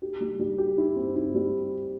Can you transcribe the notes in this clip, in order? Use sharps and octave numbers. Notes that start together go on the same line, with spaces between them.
G4
G3
G3
G4
E4
C4
E4
G3